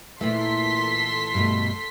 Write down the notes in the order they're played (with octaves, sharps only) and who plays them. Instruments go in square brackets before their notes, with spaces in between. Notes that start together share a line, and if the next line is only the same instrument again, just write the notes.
[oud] A#2 E3 E4 [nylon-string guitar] A3 [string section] A4 C6 B6
[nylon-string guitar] G2 B2 A3